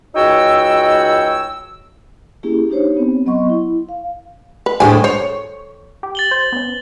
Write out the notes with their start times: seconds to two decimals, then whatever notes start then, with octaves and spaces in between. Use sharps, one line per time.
0.15 C#2 D#4 F#4 C#5 G5 E6
2.43 A#3 C#4 E4 G4 G#4
2.70 D4 D#4 G4 C5 C#5
2.97 B3 C4
3.26 F#3 B3 D#5 F#5 C6 C#6
3.49 E4
3.89 F5
4.66 B4
4.80 D2 A2 G#3 G4 G#5
5.04 C5 C#5
6.03 G4
6.15 A6 F#7 G7
6.31 C5
6.52 B3 C#4